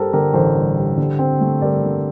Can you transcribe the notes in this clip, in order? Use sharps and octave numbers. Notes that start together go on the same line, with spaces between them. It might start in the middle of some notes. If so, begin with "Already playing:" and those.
Already playing: G2 G3 G4 A4 A#4 C5
D3 G4 A#4
A1 A4 C5
G2
G3
D3
C4
A3
G2 A#4 D5
D3